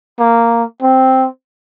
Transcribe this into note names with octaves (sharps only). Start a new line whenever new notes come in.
A#3
C4